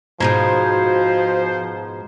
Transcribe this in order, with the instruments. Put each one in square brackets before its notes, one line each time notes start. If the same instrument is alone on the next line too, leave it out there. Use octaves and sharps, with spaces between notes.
[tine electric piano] G#2 A#5 G#6 [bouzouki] B2 D#3 G#3 [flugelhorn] F3 [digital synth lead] C5